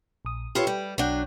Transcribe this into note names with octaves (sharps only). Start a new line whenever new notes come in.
A#1 D#6
F4 G4 A4 B4 C#5
G3
B1 F#3 D4 F#5 G5